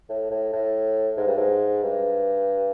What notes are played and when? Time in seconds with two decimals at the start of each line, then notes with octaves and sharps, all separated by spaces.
0.09 A2
0.31 A2
0.53 A2
1.17 G#2
1.27 G2
1.37 G#2
1.83 G2